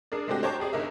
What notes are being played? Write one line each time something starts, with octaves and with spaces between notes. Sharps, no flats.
D4 G#4 A#4 D5
G#3 A3 C4 D4 F#4 G4
C5 C#5 G5 A5 A#5 D6
G4 G#4 D5
G1 D#4 A#4 E5